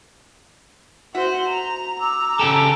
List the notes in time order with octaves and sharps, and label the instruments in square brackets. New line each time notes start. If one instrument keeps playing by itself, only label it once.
[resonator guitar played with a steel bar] F#4 E5 [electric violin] C5 F#5
[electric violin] A#5
[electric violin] A#5 [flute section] D6 E6
[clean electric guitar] C#3 G4 A4